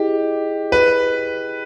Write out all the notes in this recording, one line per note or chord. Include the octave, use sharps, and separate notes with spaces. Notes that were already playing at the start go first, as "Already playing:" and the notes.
Already playing: E4 G4 G#4 D#5
B4